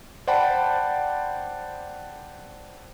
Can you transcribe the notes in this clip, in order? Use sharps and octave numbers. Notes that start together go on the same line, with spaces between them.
C5 D5 F#5 G5 A5 B5